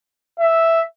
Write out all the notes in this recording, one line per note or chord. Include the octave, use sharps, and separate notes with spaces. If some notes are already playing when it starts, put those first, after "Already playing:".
E5